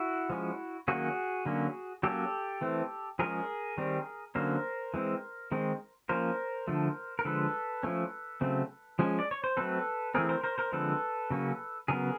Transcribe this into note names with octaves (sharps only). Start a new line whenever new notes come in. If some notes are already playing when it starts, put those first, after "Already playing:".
Already playing: E4 F#4
F3 G#3 C#4
D#3 F#3 A#3 C#4 F#4 G#4
D3 F#3 A#3 C#4
F#3 A#3 C#4 G4 A4
E3 A3 C4
F3 G#3 C#4 G#4 A#4
D#3 G3 C4
D3 F#3 A#3 C#4 A#4 C5
E3 G#3 C4
D#3 G#3 C4
F3 A#3 C#4 A#4 C5
D3 F3 A3
A#4
D3 F3 G#3 A4 B4
F3 A3 C#4
C#3 F#3 A3 C4
F3 G#3 C#4
D5
C#5
C5
F#3 A3 C4 A4 B4
E3 A3 C4 G#4 A#4
A#4 C5
A#4 C5
A#4 C5
D3 F3 G#3 C4 A4 B4
C#3 F#3 A#3 C#4
C#3 F#3 B3 G#4 A#4